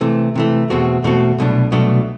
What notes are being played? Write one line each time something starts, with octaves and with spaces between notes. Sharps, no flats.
C3 E3 A3
C3 E3 A3
E2 B2 A3 C4 F#4
E2 B2 A3 C4 F#4
C2 B2 F#3 A3 D4
C2 B2 F#3 A3 D4